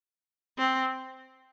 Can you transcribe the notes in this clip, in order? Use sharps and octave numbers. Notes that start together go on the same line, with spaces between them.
C4